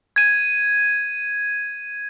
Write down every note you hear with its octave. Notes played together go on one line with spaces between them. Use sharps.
G#6 D#7